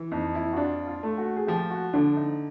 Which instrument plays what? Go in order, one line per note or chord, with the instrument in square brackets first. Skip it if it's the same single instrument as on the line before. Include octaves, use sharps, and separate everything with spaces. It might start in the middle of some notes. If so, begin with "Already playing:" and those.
Already playing: [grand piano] E3
[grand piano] F2 [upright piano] D#4
[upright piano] E4
F#4
[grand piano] D4 [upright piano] F4
[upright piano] F4
[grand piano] A3
[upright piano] F#4
G#4
[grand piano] F3 [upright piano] G4
[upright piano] F#4
[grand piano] D3 [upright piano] D4
[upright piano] D#4